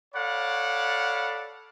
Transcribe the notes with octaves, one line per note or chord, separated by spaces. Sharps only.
A4 C#5 D5 F5 F#5 B5